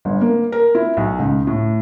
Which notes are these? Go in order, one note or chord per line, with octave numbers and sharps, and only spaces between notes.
G1
A#3
A#4
E4
B1
C#2
A2